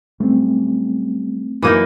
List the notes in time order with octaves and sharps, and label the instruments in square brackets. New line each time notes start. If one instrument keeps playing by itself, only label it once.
[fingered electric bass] F#3 G3 C#4 [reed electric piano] A3 C4
[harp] F#2 D6 D#6 [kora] E3 A#3 D#4